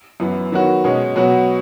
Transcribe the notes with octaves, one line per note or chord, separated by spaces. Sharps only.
F#2 E3 B3
D#3 F#3 B3 F#4
B2 G#3 C#4
B2 F#3 B3 F#4